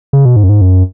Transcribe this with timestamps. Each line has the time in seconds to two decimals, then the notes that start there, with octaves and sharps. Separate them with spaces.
0.13 C#3
0.25 B2
0.36 G#2
0.43 F#2
0.49 G#2
0.61 F#2